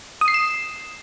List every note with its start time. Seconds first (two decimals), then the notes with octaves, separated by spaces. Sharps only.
0.21 D#6
0.28 C7
0.34 E7